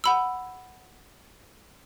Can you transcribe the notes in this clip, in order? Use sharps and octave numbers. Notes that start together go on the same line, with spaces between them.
F#5 B5 E6